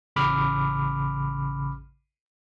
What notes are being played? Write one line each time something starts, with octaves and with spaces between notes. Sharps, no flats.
A1 C#3 B5 D6 F6